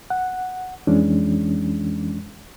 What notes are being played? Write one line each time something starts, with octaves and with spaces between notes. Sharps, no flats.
F#5
F2 E3 G#3 C#4 D4